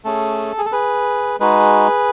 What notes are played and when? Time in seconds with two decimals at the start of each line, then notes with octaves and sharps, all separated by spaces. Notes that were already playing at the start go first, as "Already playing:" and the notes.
0.05 A3 C#4 G#4 A4
0.58 G#4
0.65 A4
0.72 G#4 B4
1.40 G#3 D#4 F#4 G#4 B4